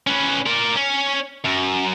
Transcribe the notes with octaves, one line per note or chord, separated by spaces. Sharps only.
C#4 B4
A#4 D5
C#4
F#2